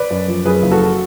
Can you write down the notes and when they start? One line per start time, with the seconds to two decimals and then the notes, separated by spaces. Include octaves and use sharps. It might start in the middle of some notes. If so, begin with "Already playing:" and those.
Already playing: B4 D5
0.11 F#2
0.28 F3
0.45 F#2 G#4 B4
0.63 F#1
0.71 F#4 A4